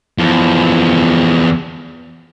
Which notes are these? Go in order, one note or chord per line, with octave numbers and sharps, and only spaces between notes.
E2 F3